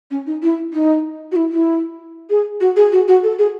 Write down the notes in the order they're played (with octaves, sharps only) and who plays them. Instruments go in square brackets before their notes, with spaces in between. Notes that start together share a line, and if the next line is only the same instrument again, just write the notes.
[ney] C#4
D#4
E4
D#4
F#4
E4
E4
G#4
F#4
G#4
F#4
F#4
A4
G#4